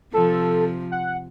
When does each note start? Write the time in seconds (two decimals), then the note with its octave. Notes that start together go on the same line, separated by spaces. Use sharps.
0.13 C3 F3 A4
0.91 F#5